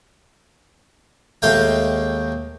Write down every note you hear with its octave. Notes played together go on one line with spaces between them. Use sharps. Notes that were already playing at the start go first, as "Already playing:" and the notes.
D#2 G#3 A3 F5 G5